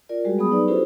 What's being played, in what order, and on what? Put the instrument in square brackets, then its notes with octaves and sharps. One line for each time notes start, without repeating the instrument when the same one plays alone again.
[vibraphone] F4 A#4 D5
G3 G#3 F#4 G#4
F#3 B3 G#4 B5 D#6
D#4 B4 D5
C#4 E4 F#4 G4 A4 C5